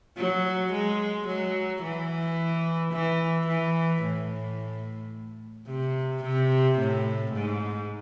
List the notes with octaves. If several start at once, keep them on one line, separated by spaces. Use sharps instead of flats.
F#3
G#3
F#3
E3
E3
E3
A2
C3
C3
A2
G#2